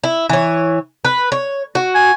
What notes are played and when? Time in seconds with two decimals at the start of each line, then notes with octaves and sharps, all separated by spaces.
0.04 E4
0.29 E3 C#5
1.05 B4
1.32 C#5
1.75 F#4
1.95 G#5